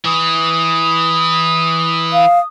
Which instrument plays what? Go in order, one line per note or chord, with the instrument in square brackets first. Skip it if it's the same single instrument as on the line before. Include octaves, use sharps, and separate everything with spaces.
[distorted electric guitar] E3 [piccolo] D#6
[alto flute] F5